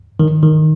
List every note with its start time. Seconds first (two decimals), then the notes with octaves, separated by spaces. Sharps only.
0.20 D#3
0.43 D#3